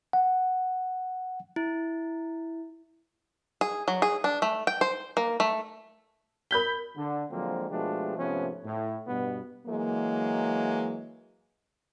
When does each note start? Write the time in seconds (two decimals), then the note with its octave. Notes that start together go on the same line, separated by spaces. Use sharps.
0.13 F#5
1.56 E4
3.61 G#4
3.88 F#3
4.02 G#4
4.24 D4
4.42 A3
4.67 G5
4.81 C5
5.17 A#3
5.40 A3
6.51 A#4 B5 G6 B6 G7
6.97 D3
7.31 D3 F3 F#3 G#3 A#3 C4
7.70 B2 F3 G#3 A3 D4 G4
8.18 G#2 C3 F3 A3 B3 C#4
8.65 A2
9.07 G2 B2 B3
9.67 E3 F#3 G#3 A#3